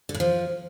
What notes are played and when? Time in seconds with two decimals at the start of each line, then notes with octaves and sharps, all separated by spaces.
0.09 D3
0.15 A2
0.20 F3